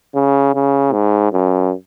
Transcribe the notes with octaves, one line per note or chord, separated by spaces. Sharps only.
C#3
C#3
G#2
F#2